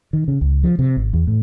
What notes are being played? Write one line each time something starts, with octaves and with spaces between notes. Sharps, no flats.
D#3
C#3
C#2
F3
C3
G#1
E2
A2